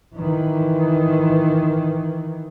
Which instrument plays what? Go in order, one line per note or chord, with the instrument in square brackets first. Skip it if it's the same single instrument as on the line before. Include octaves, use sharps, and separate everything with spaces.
[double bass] D#3 E3